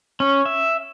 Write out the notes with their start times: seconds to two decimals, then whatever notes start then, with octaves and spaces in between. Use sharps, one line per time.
0.20 C#4
0.45 E5